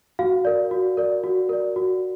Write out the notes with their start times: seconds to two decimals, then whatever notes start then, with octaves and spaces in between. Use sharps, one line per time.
0.19 F#4 F5
0.45 A#4 D5
0.71 F#4
0.97 A#4 D5
1.24 F#4
1.49 A#4 D5
1.76 F#4